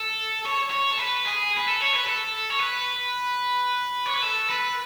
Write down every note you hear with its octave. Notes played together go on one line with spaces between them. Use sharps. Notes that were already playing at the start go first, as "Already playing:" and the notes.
Already playing: A4
C#5
C#5
A4
B4
G#4
B4
A4
C#5
B4
A4
C#5
B4
C#5
B4
A4
B4